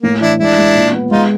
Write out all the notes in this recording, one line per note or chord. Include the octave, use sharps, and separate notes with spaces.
A2 A#3
E3 D4 E4
G#3 D4 E4
G#3
A#2
B3
G#3 D#4 F4